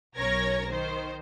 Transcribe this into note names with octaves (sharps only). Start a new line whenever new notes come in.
B1 C#4 A#4 C#5 G#6 A#6
D#3 C5